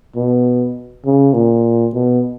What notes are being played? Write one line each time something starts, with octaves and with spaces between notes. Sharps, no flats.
B2
C#3
A#2
B2